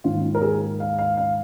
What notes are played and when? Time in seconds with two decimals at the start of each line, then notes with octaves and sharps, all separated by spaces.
0.04 G#2 D#3 A#3 F4
0.35 A#4
0.42 G#4
0.80 F5
0.99 F5
1.17 F5